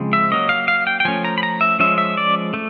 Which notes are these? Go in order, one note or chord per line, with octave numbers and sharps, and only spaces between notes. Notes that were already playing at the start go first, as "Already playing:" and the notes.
Already playing: C#3 F3 G#3 C4
E5
F#3 A#3 C#4 D#5
F5
F5
G5
G5
F3 A3 C#4 G#5
A#5
B5
A#5
E5
F3 G#3 C#4 E5
E5
D5
A3